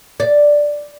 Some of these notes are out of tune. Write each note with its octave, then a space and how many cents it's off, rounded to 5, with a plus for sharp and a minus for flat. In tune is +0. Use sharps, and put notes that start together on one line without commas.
D5 +0